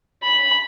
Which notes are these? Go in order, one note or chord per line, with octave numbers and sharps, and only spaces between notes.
B5